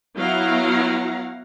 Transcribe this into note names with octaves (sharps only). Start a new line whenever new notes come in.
F#3 B3 E4 F5 F#5 A#5